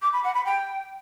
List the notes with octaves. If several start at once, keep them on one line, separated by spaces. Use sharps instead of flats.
D6
B5
F#5
B5
G5